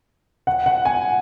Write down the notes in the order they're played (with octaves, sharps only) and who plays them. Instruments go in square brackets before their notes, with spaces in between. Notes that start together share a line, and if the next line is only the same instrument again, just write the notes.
[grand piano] F#5
F#5
G#5